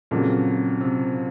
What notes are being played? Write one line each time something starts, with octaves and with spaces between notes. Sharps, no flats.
F2 A#2 C#3 F#3
C3